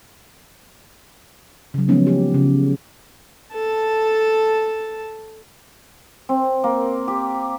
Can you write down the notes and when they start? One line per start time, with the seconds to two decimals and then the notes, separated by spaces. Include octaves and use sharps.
1.74 C#3 F#3
1.88 F3 G#3 A#3 B3 C#4 D#4
2.07 G4
2.34 C#3
3.54 A4 A5
6.29 C4
6.64 A#3
7.08 G4